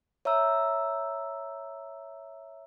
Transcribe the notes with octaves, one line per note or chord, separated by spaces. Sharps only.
C#5 E5 A#5 E6